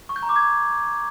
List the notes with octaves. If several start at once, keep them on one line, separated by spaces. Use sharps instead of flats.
C#6
G6
A#5
D6
G#6